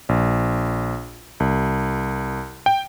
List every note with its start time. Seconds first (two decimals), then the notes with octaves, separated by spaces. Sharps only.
0.09 A#1
1.40 C2
2.66 G5